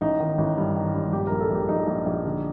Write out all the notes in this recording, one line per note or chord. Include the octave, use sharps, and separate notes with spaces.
A1 D#4
D#3
A1
G2
D#3
G2
A#1 G4
A#1 A#4
A4
A#1 G4
A#1 D#4
A#1
A#1
D3